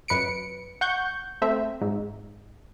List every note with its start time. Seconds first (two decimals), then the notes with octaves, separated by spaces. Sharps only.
0.08 F#2 B4 C#7 D7
0.81 F#5 C#6 G6
1.42 A3 C4 E5
1.81 G#2